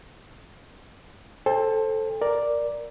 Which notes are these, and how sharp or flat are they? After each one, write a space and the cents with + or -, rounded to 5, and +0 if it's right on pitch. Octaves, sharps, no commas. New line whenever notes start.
A4 +0 C5 +15 G5 +35
A#4 +5 D5 +0